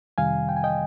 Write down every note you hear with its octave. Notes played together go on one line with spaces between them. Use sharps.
F2 C3 D#3 G3 F5 G#5
G5
G#5
D#5 G5